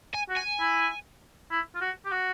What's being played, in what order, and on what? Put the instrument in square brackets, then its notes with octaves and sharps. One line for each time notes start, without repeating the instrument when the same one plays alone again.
[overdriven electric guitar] G#5
[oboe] F#4
[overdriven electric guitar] G#5
[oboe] E4
E4
F4
F#4
G4
F#4